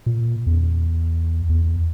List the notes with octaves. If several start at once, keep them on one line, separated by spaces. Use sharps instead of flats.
A#2
E2
E2